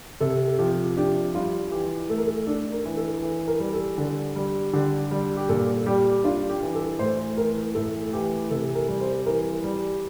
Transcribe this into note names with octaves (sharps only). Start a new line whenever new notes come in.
C3 A4
F3 G4
D4 G4
G3 F4
E3 G4
A3 A4
A#4
A4
D4 A4
A#4
E3
A4
E3
A#4
G3
A4
D3
G3
D3 G4
G3
G4
A#2 A4
G3 G4
D4 F4
G4
E3
A4
A2 C5
E3 A#4
A2 A4
E3 G4
C3 A4
A#4
G3
C5
E3 A#4
G3